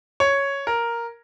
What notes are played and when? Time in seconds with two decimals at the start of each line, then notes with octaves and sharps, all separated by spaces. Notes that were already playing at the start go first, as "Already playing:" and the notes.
0.20 C#5
0.67 A#4